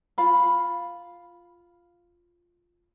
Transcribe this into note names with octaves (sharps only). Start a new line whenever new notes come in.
F4 F5 B5